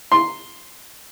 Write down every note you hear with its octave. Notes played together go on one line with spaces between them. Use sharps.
C6